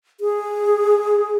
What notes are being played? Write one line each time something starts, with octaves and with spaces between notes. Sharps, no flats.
G#4